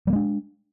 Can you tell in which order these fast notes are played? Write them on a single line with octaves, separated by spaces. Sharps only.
G3 A#3 G#3 D4